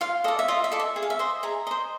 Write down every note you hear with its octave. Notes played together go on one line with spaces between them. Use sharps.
F4 F5
A4 D5 D#5
E5
F4 D#5
E5
A4 D5
E5
G#4 E5
F5
E5
C5 D#5
G#4 A#5
C5 D#5